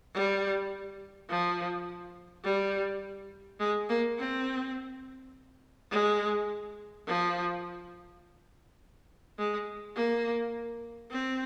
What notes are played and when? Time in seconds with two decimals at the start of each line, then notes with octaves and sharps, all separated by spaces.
0.14 G3
1.29 F3
2.44 G3
3.60 G#3
3.89 A#3
4.18 C4
5.91 G#3
7.07 F3
9.38 G#3
9.96 A#3
11.11 C4